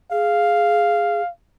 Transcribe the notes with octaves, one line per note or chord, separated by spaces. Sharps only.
G#4 F5